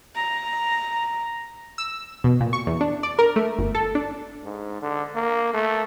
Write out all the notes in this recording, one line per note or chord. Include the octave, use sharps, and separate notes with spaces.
A#5
E6
B2
A#2
C#6
E2
D4
D5
A#4
A3
G1
A4
D4
G#2
D3
A#3
A3